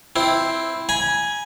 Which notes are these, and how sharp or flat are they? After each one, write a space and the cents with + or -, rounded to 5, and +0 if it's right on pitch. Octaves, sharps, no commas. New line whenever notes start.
C4 +0 E4 +0
G#5 +0 B5 -40